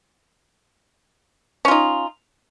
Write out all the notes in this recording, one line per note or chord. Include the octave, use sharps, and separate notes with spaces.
C#4 D#4 F4